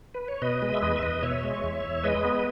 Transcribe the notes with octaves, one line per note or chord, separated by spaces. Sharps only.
B4
C#5
B2 B4 D#5
G#3
E5
E2 B4 D#5
E5
E2 B4 D#5
B2 C#5 E5
G#3
E2
E2
G#3 B4 D#5
B3